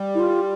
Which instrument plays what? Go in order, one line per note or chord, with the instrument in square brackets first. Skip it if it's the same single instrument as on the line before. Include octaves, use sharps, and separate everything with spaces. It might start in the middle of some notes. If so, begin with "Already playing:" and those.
Already playing: [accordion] G3
[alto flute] E4
F4